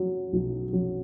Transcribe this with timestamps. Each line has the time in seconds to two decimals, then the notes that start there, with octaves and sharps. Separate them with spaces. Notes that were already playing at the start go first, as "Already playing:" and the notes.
Already playing: F#3
0.33 B1
0.73 F#3